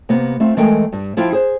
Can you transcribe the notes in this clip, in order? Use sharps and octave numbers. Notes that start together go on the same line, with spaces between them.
C3 A#3 B3
A3 C4 F4
E3 G#3 A3 A#4 G5
G2
F3 E4 F4 F5 G5
G#4 C5